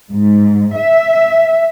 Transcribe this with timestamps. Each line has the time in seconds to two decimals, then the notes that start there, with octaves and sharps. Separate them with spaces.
0.11 G#2
0.76 E5